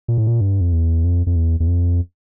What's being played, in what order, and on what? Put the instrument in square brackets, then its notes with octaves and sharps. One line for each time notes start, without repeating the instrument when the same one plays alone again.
[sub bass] A#2
A2
A#2
G2
F2
E2
F2
F2
E2
E2
F2